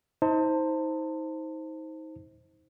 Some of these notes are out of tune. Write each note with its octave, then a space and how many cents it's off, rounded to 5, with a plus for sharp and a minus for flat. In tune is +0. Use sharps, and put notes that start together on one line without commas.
D#4 +35 C5 +0 A5 +30